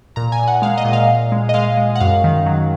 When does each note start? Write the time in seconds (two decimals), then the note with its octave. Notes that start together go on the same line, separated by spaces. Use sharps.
0.16 A#2 A#5
0.32 G#5
0.39 A#2
0.48 F#5
0.62 G#3 F5
0.78 D#5
0.85 A#2
0.93 F5
1.08 A#2
1.32 G#3
1.49 D#5
1.54 G#3 F5
1.77 G#3
1.95 F#5
2.00 F#2 F5
2.24 D#3
2.46 F#3